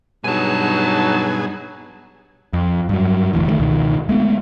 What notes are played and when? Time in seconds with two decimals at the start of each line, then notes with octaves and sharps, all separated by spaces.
0.24 G2 B2 F#3 D#4 G#4 G#5 A5
2.53 F2
2.89 G2 F#3
3.33 F1 D2 E3
3.47 D#3 F3 A3
3.59 C#2 B2 D#3
4.09 G#3 A3 B3